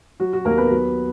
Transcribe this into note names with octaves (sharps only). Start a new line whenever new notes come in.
F#3 F#4
F#4
D#2 A#3 A#4
B3 B4
F#3